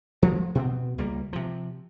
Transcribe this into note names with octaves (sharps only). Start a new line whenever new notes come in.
F3 F#3 A3
B2 B3 C4
C#2 G3 A#3
C3 F3